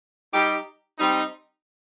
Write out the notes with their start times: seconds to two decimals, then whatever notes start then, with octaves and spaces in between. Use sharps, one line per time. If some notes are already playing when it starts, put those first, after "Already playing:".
0.33 G3 D#4 G4
0.98 G3 C4 D#4